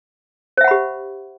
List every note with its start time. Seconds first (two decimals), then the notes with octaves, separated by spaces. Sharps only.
0.57 C5
0.61 E5
0.64 F#5
0.68 B5
0.71 G4